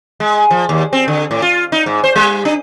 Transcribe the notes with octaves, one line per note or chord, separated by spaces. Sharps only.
G#3
F3
D#2
C4
D3
A2
F4
D#4
G#2
C5
G3
D4